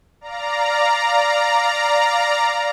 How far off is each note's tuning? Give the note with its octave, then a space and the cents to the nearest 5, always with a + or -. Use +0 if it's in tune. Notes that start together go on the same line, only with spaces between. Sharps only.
D5 +0 F5 +0 A#5 +0